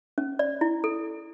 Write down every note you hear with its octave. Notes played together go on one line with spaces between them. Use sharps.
C#4
D5
E4
A4